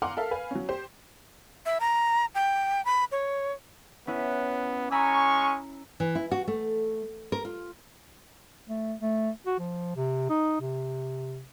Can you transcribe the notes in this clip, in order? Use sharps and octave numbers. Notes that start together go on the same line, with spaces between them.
F5 F#5 G#5 A#5 C6 D6
A4 A#4 E5 F5
B4 F5 G#5
F#3 C#4
G4 C5
E5
A#5
G5
B5
C#5
B3 C#4 E4 F#6
G#3 C#4 G#5 A#5 B5 C#6 E6
E3
E4
F#4
A3
A#4
F4
A3
A3
F#4
F3
C3
D#4
C3